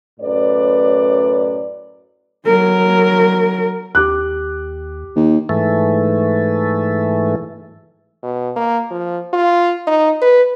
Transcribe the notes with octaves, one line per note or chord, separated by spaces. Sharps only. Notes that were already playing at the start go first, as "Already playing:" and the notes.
F#2 A2 B4 D5
F#3 A#4
D#2 G4 D6 F#6
D#2
G#2 E3 A3
B2
A#3
F3
F4
D#4
B4